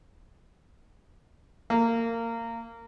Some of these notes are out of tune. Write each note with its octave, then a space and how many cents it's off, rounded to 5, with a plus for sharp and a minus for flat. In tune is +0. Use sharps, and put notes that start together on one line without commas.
A#3 -20